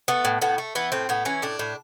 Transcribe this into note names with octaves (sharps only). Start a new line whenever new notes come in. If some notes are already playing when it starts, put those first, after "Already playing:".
A3 B3
A2
A2 B3
A3
E3 B3
A2 C4
A2 B3
E3 C#4
A2 D4
A2